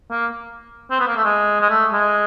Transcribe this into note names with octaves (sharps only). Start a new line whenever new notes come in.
A#3
C4
B3
A#3
A3
G#3
G#3
A3
G#3